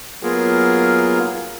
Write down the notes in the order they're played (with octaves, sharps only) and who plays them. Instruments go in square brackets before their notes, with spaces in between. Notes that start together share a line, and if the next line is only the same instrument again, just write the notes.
[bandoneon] F#3 A#3 B3 F4 G#4 A#4